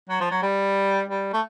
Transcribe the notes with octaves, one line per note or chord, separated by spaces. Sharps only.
F#3
F3
F#3
G3
G3
A3